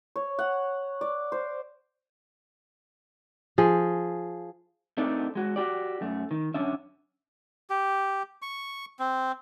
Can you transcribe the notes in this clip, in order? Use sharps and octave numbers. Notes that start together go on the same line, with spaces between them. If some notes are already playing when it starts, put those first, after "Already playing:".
C#5
F#5
D5
C5
F3 G#4
A3 C4 D4 D#4 A4 A#4
G#3 F#4
F#4 G4 D5
F#2 A3
D#3
F#2 D3 E3 C#4 D4 E5
G4
C#6
C4